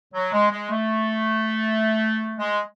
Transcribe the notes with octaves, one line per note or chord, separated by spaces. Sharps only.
F#3
G#3
G#3
A3
G#3